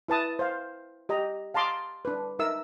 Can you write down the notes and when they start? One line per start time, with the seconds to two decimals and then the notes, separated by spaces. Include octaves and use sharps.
0.08 E4 B4 A5 D#6
0.39 C5 F5
1.09 G4 D#5 A#5
1.54 F5 A5 A#5 C6 D6 D#6
2.05 D4 B4
2.39 D#4 A#4 E5 E6